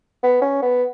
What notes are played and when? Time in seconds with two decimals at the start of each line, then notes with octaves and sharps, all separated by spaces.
0.23 B3
0.42 C#4
0.62 B3